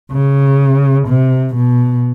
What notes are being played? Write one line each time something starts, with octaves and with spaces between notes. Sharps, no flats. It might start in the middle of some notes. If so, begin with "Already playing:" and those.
C#3
C3
B2